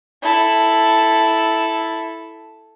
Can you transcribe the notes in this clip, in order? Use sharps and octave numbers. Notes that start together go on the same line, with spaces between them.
E4 A4